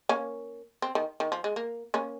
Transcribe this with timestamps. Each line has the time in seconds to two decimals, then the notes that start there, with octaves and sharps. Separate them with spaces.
0.09 A#3 C#4
0.82 C4
0.95 D#3
1.20 D#3
1.32 F3
1.44 G#3
1.56 A#3
1.94 A#3 C#4